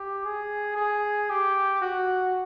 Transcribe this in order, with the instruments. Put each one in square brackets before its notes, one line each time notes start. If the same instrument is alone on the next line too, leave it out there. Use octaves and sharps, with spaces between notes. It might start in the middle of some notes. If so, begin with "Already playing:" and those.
Already playing: [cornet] G4
G#4
G#4
G4
F#4